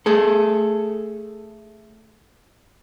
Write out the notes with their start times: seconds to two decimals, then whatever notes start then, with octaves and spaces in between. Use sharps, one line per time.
0.06 A3 G#4 A4